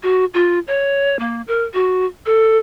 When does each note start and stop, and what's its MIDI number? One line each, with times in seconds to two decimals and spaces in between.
0.03 0.25 66
0.34 0.59 65
0.67 1.19 73
1.19 1.42 58
1.47 1.63 70
1.74 2.06 66
2.26 2.57 69